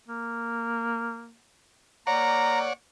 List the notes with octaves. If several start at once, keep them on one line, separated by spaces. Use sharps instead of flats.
A#3
A#3 C#5 D5 F#5 A#5